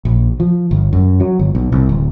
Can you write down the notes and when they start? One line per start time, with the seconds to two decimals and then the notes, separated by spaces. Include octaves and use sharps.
0.05 A#1
0.40 F3
0.71 G1
0.93 F#2
1.20 F#3
1.39 G1
1.55 B1
1.72 C2
1.89 D1